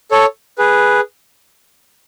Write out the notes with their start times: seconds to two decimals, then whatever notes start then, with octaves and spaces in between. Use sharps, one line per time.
0.11 A4 C#5
0.58 G#4 B4